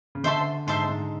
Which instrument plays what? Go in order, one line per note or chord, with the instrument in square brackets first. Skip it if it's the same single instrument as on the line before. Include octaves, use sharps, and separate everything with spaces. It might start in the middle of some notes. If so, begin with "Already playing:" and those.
[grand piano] C#3
[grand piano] D3 [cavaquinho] C5 E5 A5 C6
[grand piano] G#2 [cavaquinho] C5 E5 A5 C6
[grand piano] G#2